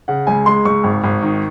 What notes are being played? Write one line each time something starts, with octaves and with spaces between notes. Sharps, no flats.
C#3 F#5
C#2 G#5
G#3 C6
C#2 C#6
G#1
G#1
D#3